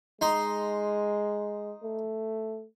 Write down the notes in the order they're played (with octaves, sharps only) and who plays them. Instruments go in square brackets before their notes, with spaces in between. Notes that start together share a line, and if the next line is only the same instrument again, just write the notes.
[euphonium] G#3 [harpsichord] D#4 C6
[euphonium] A3